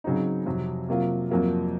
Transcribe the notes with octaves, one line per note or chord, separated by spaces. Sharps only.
C#3 F#3 C4 D#4
F2 C3 F#3
C3 F#3 A#3 F4
F2 C3 F#3 A#3 F4